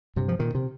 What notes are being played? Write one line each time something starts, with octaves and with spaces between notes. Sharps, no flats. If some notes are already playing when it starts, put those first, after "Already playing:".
G2 C3
F3
A#2 D#3
C3